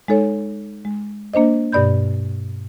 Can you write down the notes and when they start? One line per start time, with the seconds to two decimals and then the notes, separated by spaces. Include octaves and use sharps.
0.08 G#3 D#4 A4 C#5
0.85 G#3
1.34 A#3 D4 C5 D#5
1.72 G2 B2 D5 B5 G6